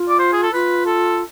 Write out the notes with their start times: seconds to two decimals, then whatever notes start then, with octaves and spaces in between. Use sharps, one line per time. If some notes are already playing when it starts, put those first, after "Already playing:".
Already playing: F4
0.09 D5
0.19 C5
0.33 G#4
0.43 A4
0.53 F4 B4
0.86 A4